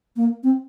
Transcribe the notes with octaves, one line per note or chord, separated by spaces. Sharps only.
A#3
C4